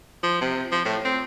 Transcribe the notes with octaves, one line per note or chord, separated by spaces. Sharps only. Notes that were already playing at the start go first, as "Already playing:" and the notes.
F3
C3
F3
A2
C4